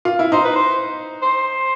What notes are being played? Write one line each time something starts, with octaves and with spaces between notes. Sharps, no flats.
F4
E4
D#4 C5
B4
C5
C5